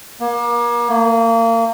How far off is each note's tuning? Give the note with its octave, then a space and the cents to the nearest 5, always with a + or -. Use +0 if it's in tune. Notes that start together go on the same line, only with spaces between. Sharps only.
A#3 +35
A#3 -30